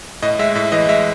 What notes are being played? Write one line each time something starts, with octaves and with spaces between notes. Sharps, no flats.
A2 D#5
G#3 E5
A2 E5
E3 D#5
G#3 E5